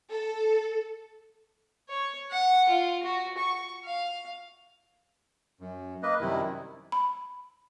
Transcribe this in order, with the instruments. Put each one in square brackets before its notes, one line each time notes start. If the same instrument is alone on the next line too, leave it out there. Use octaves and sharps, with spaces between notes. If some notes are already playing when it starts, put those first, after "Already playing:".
[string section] A4
[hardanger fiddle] C#5
F#5
F4
F#4
C#6
F5
[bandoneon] F#2
A#3 B4 D#5
F#2 C3 D#3 G3 E4
[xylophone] B5